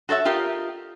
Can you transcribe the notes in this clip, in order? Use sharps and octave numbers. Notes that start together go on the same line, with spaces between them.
F#4 A4 C#5 E5
F4 G4 A#4 D#5